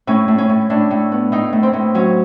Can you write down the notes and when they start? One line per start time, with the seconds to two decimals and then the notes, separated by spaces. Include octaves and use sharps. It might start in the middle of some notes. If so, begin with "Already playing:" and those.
0.07 A2 C#4
0.28 A2
0.38 C#4
0.49 A2
0.70 A2 D4
0.91 A2
1.12 B3
1.32 A2 D#4
1.53 A2
1.63 C4
1.73 A2
1.95 F#3 C#4